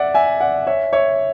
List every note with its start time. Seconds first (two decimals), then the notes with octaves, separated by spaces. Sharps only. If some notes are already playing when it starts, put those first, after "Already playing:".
Already playing: D5 E5 F#5
0.14 E5 G#5
0.40 D5 F#5
0.67 C#5 E5
0.93 C#5 E5